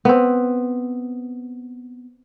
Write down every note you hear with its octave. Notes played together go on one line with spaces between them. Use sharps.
B3 C4